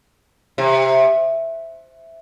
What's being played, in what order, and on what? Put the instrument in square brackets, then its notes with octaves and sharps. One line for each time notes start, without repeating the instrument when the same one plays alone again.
[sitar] C3